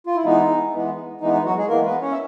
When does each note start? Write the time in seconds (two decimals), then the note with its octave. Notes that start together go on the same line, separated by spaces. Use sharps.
0.07 F4
0.16 E4
0.25 E3 G#3 B3 D#4
0.74 E3 G#3 B3
1.21 E3 G#3 B3 D#4
1.33 D#4
1.46 F#3 F#4
1.57 G#3 G#4
1.69 E3 G#3 A#3 B3 A#4
1.85 B3 B4
2.01 C#4 C#5
2.11 E5